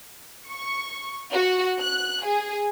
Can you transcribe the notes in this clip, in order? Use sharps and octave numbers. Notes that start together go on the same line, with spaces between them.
C#6
F#4
F#6
G#4